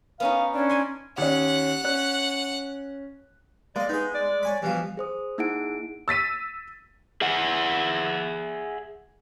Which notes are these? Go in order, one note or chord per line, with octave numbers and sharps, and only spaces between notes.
B3 C#4 D#4 F5
C#4 D4
D5 G#5 C6
D#2 C#4 F#5
C#4 F#6
G#3 A#3 D5 D#5
B3 D#4 G#4
D5
C#5 G#5 B5
G2 B2 E3 F3
G#4 C5 D#6
A#3 D#4 E4 G#4 F#5 D7
E6 A6 B6 D#7
G#4 E5 F#5